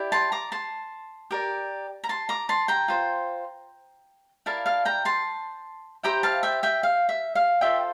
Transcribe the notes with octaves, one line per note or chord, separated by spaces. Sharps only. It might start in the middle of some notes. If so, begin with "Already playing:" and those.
Already playing: E4 G4 D5
A5 C6
A#5 D6
A5 C6
G4 A#4 D5
A#5
A5 C6
A#5 D6
A5 C6
G5 A#5
F4 C5
E4 A#4 D5 F5 A5
F5 A5
G5 A#5
A5 C6
E4 G4 C5 G5 A#5
F5 A5
E5 G5
E5 G5
F5
E5
F5
F4 A4 C5 E5 G5